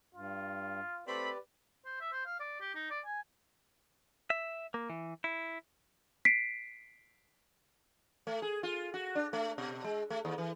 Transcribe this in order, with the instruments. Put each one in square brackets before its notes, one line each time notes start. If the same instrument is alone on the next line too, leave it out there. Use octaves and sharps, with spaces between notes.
[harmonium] G2 [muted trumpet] F4
[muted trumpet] A3 [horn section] C4 B5 [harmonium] G4 B4 D5
[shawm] C5
E5
C5
F5
D5
G4
D#4
D5
G#5
[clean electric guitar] E5
A#3
E3
E4
[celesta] B6 C7 D7
[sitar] A3
G#4
F4
F#4
D4
A3
B2
G#3
A3
D#2
E3